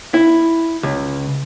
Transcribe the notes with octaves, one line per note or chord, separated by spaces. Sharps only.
E4
C#2